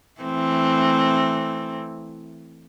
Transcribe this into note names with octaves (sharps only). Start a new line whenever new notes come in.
E3 A3 C4